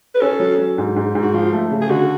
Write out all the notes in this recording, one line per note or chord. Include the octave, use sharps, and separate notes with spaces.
B4
C#4 A4
F#3
F#3
G#2
G#2
G#2
F#4
F3 F4
A3
C#3
G#4
D3 F#4